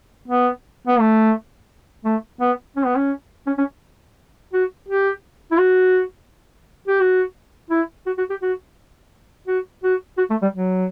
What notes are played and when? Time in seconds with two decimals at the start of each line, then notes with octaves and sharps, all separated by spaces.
0.28 B3
0.87 B3
1.00 A3
2.05 A3
2.41 B3
2.76 C#4
2.86 B3
2.96 C#4
3.47 C#4
3.58 C#4
4.53 F#4
4.88 G4
5.52 E4
5.59 F#4
6.88 G4
7.00 F#4
7.70 E4
8.06 F#4
8.18 F#4
8.30 G4
8.42 F#4
9.48 F#4
9.83 F#4
10.18 F#4
10.30 A3
10.42 G3
10.53 F#3